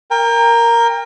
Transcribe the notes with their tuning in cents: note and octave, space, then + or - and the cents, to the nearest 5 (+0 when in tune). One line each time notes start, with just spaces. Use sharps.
A#4 +0 G5 +35